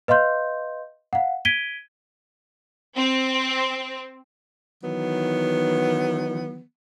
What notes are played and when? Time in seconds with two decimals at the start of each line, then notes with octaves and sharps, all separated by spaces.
0.08 B4 D#5 F5 C6 G6
1.13 F5 F#5
1.45 G#6 B6 D7 D#7 G7
2.95 C4
4.82 D#3 E3 F#3 B3